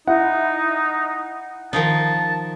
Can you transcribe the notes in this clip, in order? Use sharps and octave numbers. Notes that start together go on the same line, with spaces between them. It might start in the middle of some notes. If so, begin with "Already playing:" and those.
D#4 E4 F#5
D#3 F3 D#4 A5